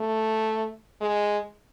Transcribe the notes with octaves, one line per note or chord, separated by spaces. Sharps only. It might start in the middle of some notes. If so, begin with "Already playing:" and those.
Already playing: A3
G#3